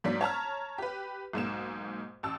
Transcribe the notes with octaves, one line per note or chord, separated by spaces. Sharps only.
G#2 F#3 A#3 D4 B6
C#5 A5 A#5 F6
G4 B4
B1 G#2 A#3 E7
A1 A5 E6